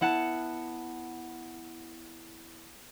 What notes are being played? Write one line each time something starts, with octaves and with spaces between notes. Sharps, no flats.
B3 E4 F#5 A5